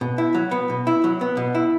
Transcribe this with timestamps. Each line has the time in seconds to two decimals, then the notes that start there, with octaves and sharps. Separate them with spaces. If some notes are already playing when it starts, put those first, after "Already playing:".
0.01 B2
0.18 E4
0.34 F#3
0.51 B3
0.70 B2
0.87 E4
1.04 F#3
1.21 B3
1.37 B2
1.55 E4